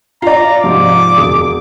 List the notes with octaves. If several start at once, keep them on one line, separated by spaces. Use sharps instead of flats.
F4 D5 A#5 C7
G#2 C3 F3 D6
E1 G#4 D#6